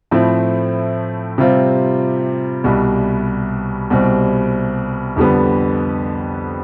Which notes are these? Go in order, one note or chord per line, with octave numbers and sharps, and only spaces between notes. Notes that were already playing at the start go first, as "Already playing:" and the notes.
A2 F3 A3 C4 E4
C3 G3 C4 F4
C2 B2 G3
C2 B2 G3 C4
F2 D3 G3 B3